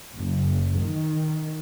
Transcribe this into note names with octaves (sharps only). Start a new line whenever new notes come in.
F#1
D#3